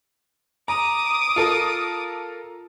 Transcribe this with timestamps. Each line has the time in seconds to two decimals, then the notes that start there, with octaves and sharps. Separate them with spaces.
0.68 A#5 D6 D#6
1.36 F4 A4 A#4